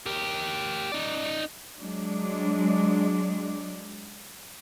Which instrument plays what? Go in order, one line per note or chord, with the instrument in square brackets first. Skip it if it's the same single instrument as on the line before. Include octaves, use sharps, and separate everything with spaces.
[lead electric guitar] G4 A#4
D#4 D5
[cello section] F#3 G#3 D4